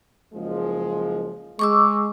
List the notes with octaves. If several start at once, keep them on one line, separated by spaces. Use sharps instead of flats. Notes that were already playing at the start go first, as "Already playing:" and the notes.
F#1 F3 G#3
G#3 C#6 D6 E6